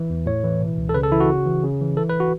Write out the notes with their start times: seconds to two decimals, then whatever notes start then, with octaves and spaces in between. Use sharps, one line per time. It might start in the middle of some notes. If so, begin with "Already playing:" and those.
Already playing: E3
0.10 E2
0.26 A2 C#5
0.44 E3
0.61 B2
0.78 C#2
0.89 A4
0.94 C#3 B4
1.03 A4
1.12 E3 E4
1.20 F#4
1.29 C#3
1.46 E3
1.63 C#3
1.81 E3
1.97 E3 A4
2.09 B4
2.20 F#4